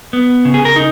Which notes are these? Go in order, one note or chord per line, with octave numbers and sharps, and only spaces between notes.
B3
C#3
G#4
A#4
D#4